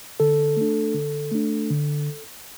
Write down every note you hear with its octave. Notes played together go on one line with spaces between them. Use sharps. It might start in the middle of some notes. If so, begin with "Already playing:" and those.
D3 A4
A3 D4
D3
A3 D4
D3